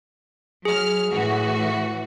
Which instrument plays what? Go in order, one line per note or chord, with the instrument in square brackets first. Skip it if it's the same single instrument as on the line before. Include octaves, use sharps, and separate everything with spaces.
[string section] F#3 F6 [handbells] G#4
[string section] A2 E3 F#4